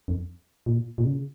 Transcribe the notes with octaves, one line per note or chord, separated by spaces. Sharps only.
F2
A#2
A#2
C#3